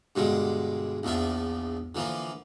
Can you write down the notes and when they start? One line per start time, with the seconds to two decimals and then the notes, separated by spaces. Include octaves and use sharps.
0.16 G2 B2 D3 G#3
1.03 A#1 E2 F3 D4 E5
1.95 D3 E3 F3 A#3